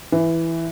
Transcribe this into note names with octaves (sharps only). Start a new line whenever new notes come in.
E3